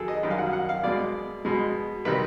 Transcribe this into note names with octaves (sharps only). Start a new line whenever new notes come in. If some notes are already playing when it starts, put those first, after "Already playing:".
Already playing: F#2 D#3 G#4 A4
D#5
F#2 D#3 G3
F5
F#5
F#5
F5
B2 G#3 D5
B2 G#3
C3 D#3 G3 B4